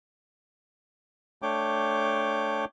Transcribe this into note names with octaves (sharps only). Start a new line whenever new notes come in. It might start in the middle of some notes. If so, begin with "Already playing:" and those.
A3 D4 C#5 G5 D6